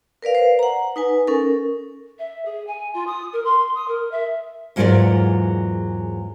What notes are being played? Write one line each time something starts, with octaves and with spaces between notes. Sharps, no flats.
A#4 B4 D5 F5
B4 C5
F#5 A#5
D#4 B4 G#5
C#4 A4 A#4
E5
G#4
G#5
F4
D#6
A#4
C6
D#6
A#4
E5
E2 G#2 F#3 F4 A#4 D5